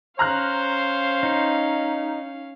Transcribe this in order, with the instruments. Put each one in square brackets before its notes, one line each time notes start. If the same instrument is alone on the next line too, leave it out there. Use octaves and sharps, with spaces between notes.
[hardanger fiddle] C#4 F5 [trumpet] C5 [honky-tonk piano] A#5 F6 F#6
[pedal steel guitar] D#4